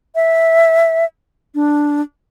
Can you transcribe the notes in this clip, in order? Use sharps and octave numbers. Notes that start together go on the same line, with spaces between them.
E5
D4